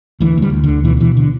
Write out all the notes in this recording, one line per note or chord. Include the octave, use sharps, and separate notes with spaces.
D2 E3
D2 G3
D3
D2 D3
B2 E3
D3
B2 E3
D3